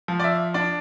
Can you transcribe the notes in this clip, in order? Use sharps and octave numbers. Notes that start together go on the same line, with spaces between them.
F3
D5
E5
D4 D5